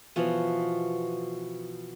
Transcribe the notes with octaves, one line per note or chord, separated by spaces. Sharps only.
B2 E3 F3 B4